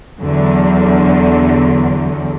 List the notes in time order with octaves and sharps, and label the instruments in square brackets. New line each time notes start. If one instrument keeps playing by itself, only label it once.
[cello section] E2 D3 F#3